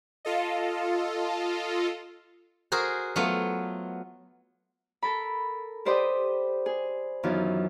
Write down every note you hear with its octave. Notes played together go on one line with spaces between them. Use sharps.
F4 A4 D#5
F#4 G#4 A#4 C5
F#3 A3 B3 F4
A4 A#4 B5
G4 B4 C5 D5 D#5 G5
G#4
F#2 D#3 E3 F#3 B3 F4